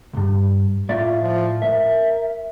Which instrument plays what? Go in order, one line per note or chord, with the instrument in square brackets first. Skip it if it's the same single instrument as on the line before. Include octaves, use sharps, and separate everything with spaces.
[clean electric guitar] C2 G2
[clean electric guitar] A2 D5 E5 [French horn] F4
[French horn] F3
[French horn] A#4 [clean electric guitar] E5